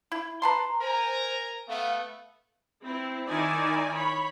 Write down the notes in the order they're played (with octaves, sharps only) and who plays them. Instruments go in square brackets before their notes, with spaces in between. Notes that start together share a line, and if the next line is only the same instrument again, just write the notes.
[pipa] E4
[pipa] B4 A5 C6 [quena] A#5
[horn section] A#4 G#5 A#5 [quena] C5
[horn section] A3 B3 [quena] F5
[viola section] C4 E4
D#3 D#4 E4 D5 G#5
C#5 B5